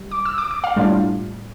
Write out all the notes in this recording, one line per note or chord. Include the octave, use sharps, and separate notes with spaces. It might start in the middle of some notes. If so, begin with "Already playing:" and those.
Already playing: G3
D6
E6
D6
D6
F5
A2 G3 D4 F4